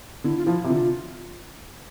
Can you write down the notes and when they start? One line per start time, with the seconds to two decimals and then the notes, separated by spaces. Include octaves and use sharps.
0.24 D3 E4
0.38 F4
0.46 F3 E4
0.64 C3
0.69 D3 F4